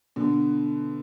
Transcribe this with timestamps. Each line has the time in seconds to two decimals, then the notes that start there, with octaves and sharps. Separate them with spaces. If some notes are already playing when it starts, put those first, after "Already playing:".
0.16 B2 D3